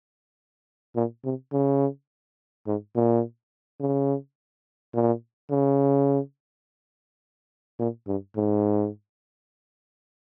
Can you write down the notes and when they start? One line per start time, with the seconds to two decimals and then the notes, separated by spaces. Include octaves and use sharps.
0.96 A#2
1.25 C3
1.52 C#3
2.67 G#2
2.96 A#2
3.80 C#3
4.94 A#2
5.51 C#3
7.79 A#2
8.07 G2
8.36 G#2